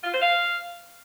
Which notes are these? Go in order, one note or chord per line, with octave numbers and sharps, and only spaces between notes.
F4
C5
F5